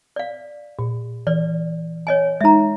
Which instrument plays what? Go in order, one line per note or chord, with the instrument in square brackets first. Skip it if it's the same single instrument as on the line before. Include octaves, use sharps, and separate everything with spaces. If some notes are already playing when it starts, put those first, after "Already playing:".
[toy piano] D5 F5
[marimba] A#2
[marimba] E3 [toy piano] D5
[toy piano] C#5 D#5 G#5
[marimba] G#3 D#4 [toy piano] E5 A#5